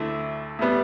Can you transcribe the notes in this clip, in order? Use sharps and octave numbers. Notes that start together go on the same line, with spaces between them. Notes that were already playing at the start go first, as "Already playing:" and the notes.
Already playing: D2 D3 A3 E4
A2 G3 B3